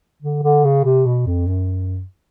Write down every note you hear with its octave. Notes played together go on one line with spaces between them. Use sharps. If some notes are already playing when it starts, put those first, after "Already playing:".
D3
D3
C#3
C3
B2
F2
F#2